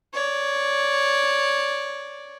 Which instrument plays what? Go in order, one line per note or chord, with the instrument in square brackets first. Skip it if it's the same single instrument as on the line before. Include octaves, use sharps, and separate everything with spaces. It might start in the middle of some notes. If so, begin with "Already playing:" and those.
[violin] C#5 D5